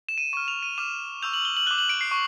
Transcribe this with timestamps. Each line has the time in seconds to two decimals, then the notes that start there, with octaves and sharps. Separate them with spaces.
0.09 E7
0.18 D#7
0.33 C#6 D#7
0.37 F6
0.48 F7
0.63 D#7
0.78 D6 F6 E7
1.22 C#6 E6 G6 F7
1.34 F#7
1.45 G7
1.57 F#7
1.67 F#6 G7
1.71 D6
1.78 F#7
1.90 D7
2.01 C7
2.11 C#6